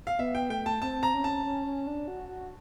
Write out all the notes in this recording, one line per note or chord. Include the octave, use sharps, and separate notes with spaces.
F5
B3 E5
G5
A3 G5
A5
C4 A5
A#5
C#4
A5
C#4
C#4
D4
F#4
F#4